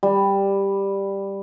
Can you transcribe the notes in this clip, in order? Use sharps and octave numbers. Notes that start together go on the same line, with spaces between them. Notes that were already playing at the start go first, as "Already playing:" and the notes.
G3